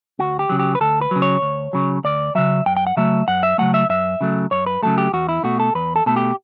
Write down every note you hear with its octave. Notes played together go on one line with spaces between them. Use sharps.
D2 F#4
G4
C#3 F#3
G4
B4
D2 A4
B4
C#3 F#3
C#5
D2
C#3 F#3
D2 D5
C#3 F#3 E5
F#2 G5
G5
F#5
C#3 F#3 A3 E5
F#2 F#5
E5
C#3 F#3 A3 F#5
E5
F#2 E5
C#3 F#3 A3
F#2 C#5
B4
C#3 F#3 A3 A4
G4
E2 F#4
E4
B2 A3 F#4
A4
E2 B4
A4
B2 A3 A4
G4